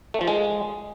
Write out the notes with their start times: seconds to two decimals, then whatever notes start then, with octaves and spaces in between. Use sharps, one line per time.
0.14 A3
0.21 F3
0.28 G#3